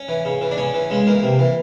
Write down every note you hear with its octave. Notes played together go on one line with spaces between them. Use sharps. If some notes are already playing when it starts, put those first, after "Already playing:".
Already playing: C#4
E3
C#3
E3
D4
C#3 C#4
E3
C#3 G#3
E3 A#3
C3
E3